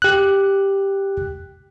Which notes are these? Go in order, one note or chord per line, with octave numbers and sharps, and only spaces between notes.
G4 F#6